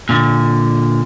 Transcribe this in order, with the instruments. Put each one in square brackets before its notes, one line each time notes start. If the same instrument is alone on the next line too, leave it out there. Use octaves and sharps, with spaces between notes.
[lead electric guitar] A#2 D3